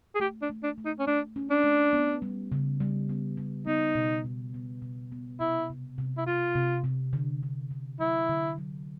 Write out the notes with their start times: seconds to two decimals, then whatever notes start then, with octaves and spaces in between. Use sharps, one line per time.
0.15 G#4
0.20 A3 G4
0.42 D4
0.50 A3
0.63 D4
0.78 A3
0.85 D#4
0.99 C#4
1.07 A3 D4
1.36 C#4
1.51 D4
1.64 A3
1.93 B3
2.22 G3
2.52 C#3
2.80 G3
3.09 B3
3.37 G3
3.67 B3 D#4
3.95 B2
4.24 B2
4.54 B3
4.82 B2
5.12 B3
5.40 C3 E4
5.70 C3
5.98 C3
6.18 E4
6.27 C3 F4
6.55 C3
6.84 C3
7.13 D3
7.43 D3
7.71 D3
8.00 F#3 E4
8.29 D3
8.58 F#3